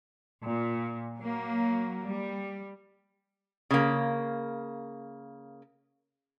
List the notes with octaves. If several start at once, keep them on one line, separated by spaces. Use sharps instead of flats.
A#2
F#3 A#3
G3
C#3 A#3